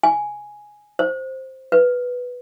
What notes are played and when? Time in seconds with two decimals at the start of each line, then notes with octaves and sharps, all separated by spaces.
0.03 G#5
0.99 C5
1.72 B4